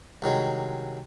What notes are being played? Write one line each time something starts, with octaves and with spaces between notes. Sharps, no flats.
C2 D#3 F#3 G#3